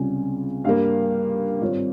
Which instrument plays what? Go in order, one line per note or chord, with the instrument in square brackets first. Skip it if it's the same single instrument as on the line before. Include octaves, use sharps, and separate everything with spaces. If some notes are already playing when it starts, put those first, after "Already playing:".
Already playing: [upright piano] C#2 C3 G3 C#4 F4 G#5
G2 G3 A#3 F5
G#1 G2 G3 C4 F4 C#5